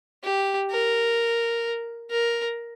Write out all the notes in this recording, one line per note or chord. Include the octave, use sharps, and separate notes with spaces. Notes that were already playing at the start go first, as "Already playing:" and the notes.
G4
A#4
A#4